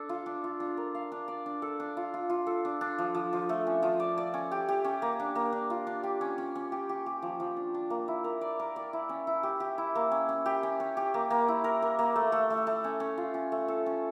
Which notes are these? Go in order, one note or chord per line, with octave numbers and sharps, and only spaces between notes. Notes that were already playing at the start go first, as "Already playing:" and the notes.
Already playing: D4 A4
F4
D4
F4
D4
A#4
F5
D4
D5
D4
A4
D4
F4
F4
F4
A4
D4
D4
F3
F3
F3
A3
C#4
F3
D5
D5
C#4
G4
G4
C#4
A#3
D4
A#3
D4
F4
D4
G4
C#4
C#4
C#4
G4
G4
G4
F3
F3
D4
D4
A#3
E4
A#4
D5
A#4
D5
E4
C#4
E4
G4
G4
E4
A#3
C#4
C#4
G4
C#4
C#4
G4
A#3
A#3
E4
A#4
A#4
A#3
A3
A3
A3
A3
C#4
C#4
F4
C#4
A3
A4
C#4